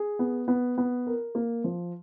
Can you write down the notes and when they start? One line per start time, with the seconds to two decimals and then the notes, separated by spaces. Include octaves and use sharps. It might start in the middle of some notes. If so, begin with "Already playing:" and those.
Already playing: G#4
0.19 B3
0.48 B3
0.78 B3
1.07 A#4
1.35 A#3
1.64 F3